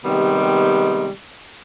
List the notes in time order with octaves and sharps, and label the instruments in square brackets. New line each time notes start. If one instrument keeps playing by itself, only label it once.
[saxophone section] C3 D#3 G3 G#3 B3